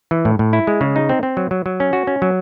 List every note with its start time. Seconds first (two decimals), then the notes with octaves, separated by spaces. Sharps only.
0.11 E3
0.25 A2
0.39 A2
0.53 E4
0.67 G#3
0.81 C#3
0.96 D#4
1.09 C4
1.23 C4
1.37 F#3
1.51 F#3
1.66 F#3
1.80 C#4
1.93 F#4
2.07 C#4
2.22 F#3